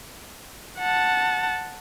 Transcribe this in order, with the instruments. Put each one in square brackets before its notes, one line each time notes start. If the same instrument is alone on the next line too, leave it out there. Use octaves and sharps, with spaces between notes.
[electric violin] F#5 A5